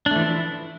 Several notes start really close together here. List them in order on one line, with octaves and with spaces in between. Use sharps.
D4 A3 E3 F3 E4